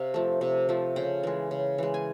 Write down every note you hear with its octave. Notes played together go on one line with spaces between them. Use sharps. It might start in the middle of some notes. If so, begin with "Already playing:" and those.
Already playing: C3 F5
F3 A3
C3
F3 A3
C#3 G5
E3 G#3
C#3
E3 G#3
G#5